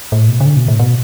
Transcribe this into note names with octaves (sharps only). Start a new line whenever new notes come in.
A2
B2
C#3
D3
B2
A2
B2